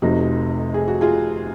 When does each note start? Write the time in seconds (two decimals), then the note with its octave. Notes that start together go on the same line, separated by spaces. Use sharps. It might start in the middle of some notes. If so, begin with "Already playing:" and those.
0.02 F1 F2 C3 D#4 F#4
0.74 G#4
0.88 F#4
1.01 F4 G#4